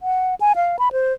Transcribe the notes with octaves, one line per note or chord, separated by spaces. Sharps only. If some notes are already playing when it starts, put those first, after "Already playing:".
F#5
G#5
F5
B5
C5